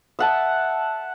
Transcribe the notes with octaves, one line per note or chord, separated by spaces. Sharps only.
E5 F#5 A5